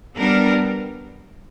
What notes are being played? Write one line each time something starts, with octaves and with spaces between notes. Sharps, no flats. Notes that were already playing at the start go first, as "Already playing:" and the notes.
G3 B3 D4 A#4